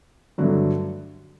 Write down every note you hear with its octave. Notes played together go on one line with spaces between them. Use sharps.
G2 D3 F#3 A3